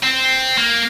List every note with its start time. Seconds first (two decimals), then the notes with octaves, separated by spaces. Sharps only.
0.03 C4
0.57 A#3